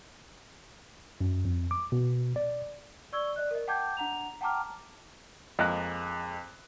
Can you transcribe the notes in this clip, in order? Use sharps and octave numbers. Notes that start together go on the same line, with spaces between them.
F#2
F2
D6
B2
D5
D5 C#6 E6 G#6 G7
D5 D#5 F#6
A#4 D#5
F#5 G5 A5 D6 G6 G#6
D4 F#5 A#5 F7
F#5 G5 A5 A#5 D6 F6
F2 G#3 A#3 A#5 F#6